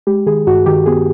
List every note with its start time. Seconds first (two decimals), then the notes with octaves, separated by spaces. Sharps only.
0.07 G#3 G4
0.26 D#3 G#4
0.47 G2 F#4
0.66 D#3 G4
0.86 B3 G#4